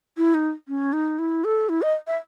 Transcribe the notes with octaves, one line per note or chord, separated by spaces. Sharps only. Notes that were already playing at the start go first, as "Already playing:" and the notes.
E4
D#4
C#4
D#4
E4
A4
E4
D#5
E5